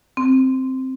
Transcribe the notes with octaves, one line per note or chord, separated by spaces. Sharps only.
C4